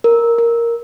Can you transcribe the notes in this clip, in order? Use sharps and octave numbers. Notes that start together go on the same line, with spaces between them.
A#4
A#4